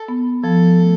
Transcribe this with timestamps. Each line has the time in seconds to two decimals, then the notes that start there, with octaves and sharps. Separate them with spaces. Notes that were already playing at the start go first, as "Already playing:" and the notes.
Already playing: A4
0.08 B3
0.44 F3 A4
0.80 A3